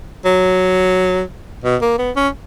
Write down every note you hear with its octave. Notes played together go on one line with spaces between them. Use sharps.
F#3
B2
A#3
B3
C#4